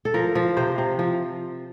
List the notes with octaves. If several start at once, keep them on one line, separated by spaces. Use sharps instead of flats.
A4
F3 A#4
F3
C3 C5
C3
F3